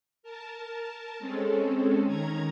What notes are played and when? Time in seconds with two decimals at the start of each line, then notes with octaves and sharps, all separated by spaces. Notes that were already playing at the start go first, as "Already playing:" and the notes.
0.23 A#4 A5
1.19 G#3 C4 C#4 A4
2.07 D#3 C#4 A#5 G#6